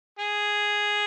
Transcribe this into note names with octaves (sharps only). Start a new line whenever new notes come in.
G#4